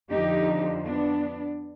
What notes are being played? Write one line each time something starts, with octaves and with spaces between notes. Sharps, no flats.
F2 D3 F3 D#4 G4
B3 D4